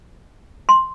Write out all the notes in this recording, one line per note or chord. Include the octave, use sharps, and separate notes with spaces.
C6